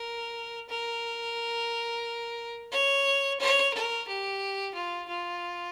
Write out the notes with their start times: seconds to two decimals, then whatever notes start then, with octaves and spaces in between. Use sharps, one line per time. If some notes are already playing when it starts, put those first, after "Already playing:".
Already playing: A#4
0.69 A#4
2.72 C#5
3.40 C#5
3.73 A#4
4.07 G4
4.74 F4
5.08 F4